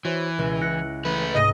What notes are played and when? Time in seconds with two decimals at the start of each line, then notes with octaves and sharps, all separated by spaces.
0.05 E3 F#4 C5 C#5
0.39 C#2 B2 E5
0.61 E4 E5 F#6 A#6 C#7
1.05 E3 A3 B4 B5
1.35 G#2 C3 D#5